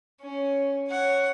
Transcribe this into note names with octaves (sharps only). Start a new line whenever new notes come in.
C#4
C#5 F#5